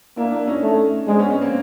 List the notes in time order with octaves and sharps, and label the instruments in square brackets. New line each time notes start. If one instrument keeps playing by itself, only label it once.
[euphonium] A#3 [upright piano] D4 E4
[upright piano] D4 E4
C#4 D#4
[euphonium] A3
[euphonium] G#3 [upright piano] C4 D4
[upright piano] B3 C#4
B3 C#4
A#3 C4